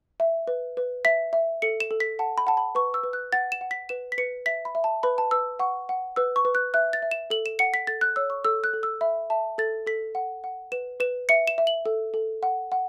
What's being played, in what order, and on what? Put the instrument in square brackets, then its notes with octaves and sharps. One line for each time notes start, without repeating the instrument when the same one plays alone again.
[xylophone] E5
B4
B4
E5 B6
E5
A4 C#7
E7
A4
B6
F#5 A5
B5
F#5 A5
B5
B4 C#6
E6
B4
F#6
F#5 A6
E7
F#5
B6
B4 E7
B6
B4 C#7
E5 B6
B5
E5
A5
B4 B5
A5
B4 E6
F#5 C#6
F#5
B4 E6
C#6
B4
F#6
E5 F#6
A6
E5
E7
A4 F#7
E7
F#5 C#7
B6
A4 A6
F#6
C#5 E6
C#6
A4 E6
F#6
A4
E6
E5 B5
E5 A5
A4 A6
A4 B6
F#5
F#5
B4 E7
B4 E7
E5 C#7
E7
E5
F#7
A4
A4
F#5
F#5